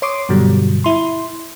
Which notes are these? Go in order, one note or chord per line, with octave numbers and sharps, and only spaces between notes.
C#5 C6 D6 D#6
G2 B2 D3 F#3 G3
E4 C6